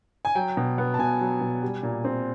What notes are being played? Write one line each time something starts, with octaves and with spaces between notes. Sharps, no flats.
G#5
F#3 G5
B2
B3
A5
B2 G#5
F#3
B2
G3
A#2
C4